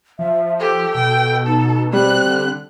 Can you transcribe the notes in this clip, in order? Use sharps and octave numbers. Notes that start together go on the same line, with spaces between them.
F3 E5
G4 A4
B2 G5
D#4 A4
G3 C4 F#6
D3